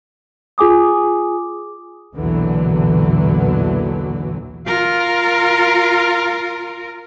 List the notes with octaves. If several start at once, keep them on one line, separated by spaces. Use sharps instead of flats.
F4 G#4 G#5 D6 D#6
B1 E2 A#2 D3 E3 F#3
F4 A#4